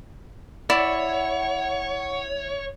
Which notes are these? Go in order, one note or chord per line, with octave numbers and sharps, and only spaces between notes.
E4 C#5 D5 F#5